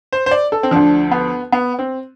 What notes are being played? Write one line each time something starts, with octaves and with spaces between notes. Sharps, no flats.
C5
C5
D5
A4
C4
D2 D3 F3 D4
B3
B3
C4